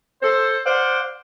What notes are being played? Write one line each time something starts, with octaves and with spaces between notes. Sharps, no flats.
A4 C5
C5 D5 F5 F#5